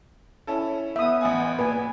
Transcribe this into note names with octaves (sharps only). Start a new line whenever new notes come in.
C#4 E4 A4
B3 E5 D#6
A1 F#5 G#5
A#2 B4 G#5